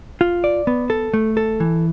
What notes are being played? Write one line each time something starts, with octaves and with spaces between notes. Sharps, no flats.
F4
D5
B3
A4
A3
A4
E3